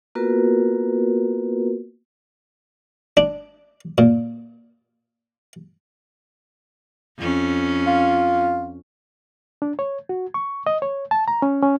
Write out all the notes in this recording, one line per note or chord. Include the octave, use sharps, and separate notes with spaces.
A#3 B3 F4 F#4 A#4 B4
D4
A#2
F2 C#4
F4
D4
C#5
F#4
C#6
D#5
C#5
A5
A#5
C#4
C#4